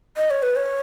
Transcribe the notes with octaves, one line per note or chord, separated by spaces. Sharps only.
D#5
C#5
B4
C#5